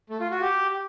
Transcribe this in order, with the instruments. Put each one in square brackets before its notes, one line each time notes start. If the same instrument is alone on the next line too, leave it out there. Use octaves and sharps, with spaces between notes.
[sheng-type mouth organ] A3
F4
F#4
G4